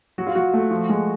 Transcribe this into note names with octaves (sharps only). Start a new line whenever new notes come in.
F#3 F#4
F4
F#3 F#4
A3
F3
G#3